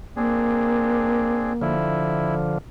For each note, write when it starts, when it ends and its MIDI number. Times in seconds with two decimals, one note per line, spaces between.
0.16 1.73 58
0.16 1.53 60
0.16 1.53 62
0.16 1.53 68
1.61 2.58 50
1.61 2.58 53
1.61 2.35 64